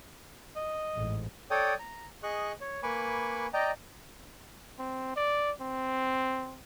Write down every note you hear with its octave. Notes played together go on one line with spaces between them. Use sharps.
D#5
A1 G#2
A4 C#5 D5 G5 D#6
A#5
G#4 D#5 C#6 F#6
C#5
A#3 B4 G#5 B5 C#6 D6
D5 D#5 G5 A#5
C4
D5
C4